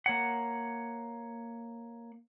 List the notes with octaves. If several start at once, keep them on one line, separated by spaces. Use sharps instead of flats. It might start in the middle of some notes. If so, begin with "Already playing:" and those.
A#3 C#5 F#5